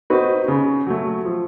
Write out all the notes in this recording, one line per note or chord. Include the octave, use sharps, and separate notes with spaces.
C4 D#4 F#4 B4
C#3
F#3 A3
F3